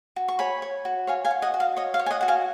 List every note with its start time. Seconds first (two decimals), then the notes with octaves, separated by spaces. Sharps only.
0.16 F#4
0.28 C#6
0.39 C#5 G#5 B5
0.62 C#5
0.85 F#4
1.07 C#5 F5 G#5
1.25 F5 G#5
1.31 F#4
1.42 D#5 F#5
1.54 F#4
1.60 F5
1.77 C#5 D#5
1.94 F5
1.99 C#5
2.06 G#5
2.11 D#5 F#5
2.21 F#4 F#5
2.28 F5 G#5